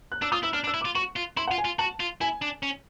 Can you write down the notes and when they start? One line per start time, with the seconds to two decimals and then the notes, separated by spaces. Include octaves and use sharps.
0.12 F#6
0.22 D4 E6
0.32 F4 D#6
0.43 E4 E6
0.53 D4 F6
0.64 D4
0.67 E6
0.74 E4
0.81 D6
0.85 F4
0.95 F#4 C#6
1.16 F4
1.37 E4 C6
1.48 F#5
1.51 F4
1.58 G#5
1.65 F4
1.79 F#4 A5
2.00 F4
2.21 E4 G#5
2.42 D4
2.63 C#4